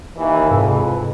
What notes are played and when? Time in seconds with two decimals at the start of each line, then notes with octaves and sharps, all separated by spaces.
0.17 D#2 E3
0.51 F2 G#2 C3 G#4 B4